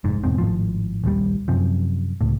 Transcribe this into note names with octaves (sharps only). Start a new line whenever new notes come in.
F1 G#2
E2 G#2 B2 C4
G#1 A2 F3
A#1 D#2 D3 G3
F#2 C3 F3
C#2 A2